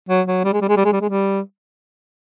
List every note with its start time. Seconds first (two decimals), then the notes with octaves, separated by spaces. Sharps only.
0.09 F#3
0.27 F#3
0.44 G3
0.53 G#3
0.62 G3
0.69 G#3
0.77 G3
0.85 G#3
0.93 G3
1.01 G#3
1.10 G3